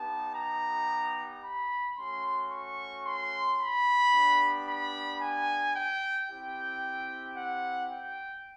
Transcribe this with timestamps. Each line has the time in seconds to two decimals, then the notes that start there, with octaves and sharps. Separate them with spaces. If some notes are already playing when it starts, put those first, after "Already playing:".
Already playing: B3 D#4 G4 A5
0.36 A#5
1.44 B5
1.97 A3 C#4 F#4 C6
2.52 C#6
3.06 C6
3.59 B5
4.14 B3 D4 G4
4.68 B5
5.22 G#5
5.76 G5
6.30 C4 E4 G4 G5
7.37 F#5
7.92 G5